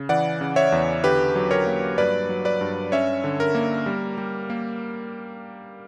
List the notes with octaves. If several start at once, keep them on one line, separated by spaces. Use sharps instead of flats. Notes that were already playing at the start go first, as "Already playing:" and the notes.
Already playing: C#3
E3 D5 F#5
C#3
C#5 E5
E2
D3 G4 B4
F#3
A#4 C#5
A#3
G2 B4 D5
F#3
B4 D5
G2
C#4 C#5 E5
D3
A#4
A#3
G3
G3
A#3